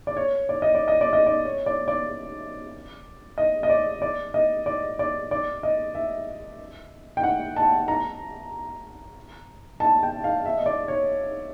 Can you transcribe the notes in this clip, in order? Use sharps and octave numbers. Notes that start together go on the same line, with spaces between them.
D5
C#5
D5
D#5
D5
D#5
D5
D#5
D5
C#5
D5
D5
D#5
D#5
D5
D5
D#5
D5
D5
D5
D#5
E5
G5
F#5
A5
A#5
A5
G5
F5
E5
D#5
D5
C#5